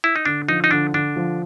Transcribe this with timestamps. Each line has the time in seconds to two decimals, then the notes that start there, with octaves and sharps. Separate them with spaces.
0.04 E4
0.16 D#4
0.25 D3 D4
0.48 F3 D#4
0.64 D#4
0.71 D3 D4
0.94 D3 D4
1.16 F3